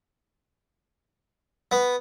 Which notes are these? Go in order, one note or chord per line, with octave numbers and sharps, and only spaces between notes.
B3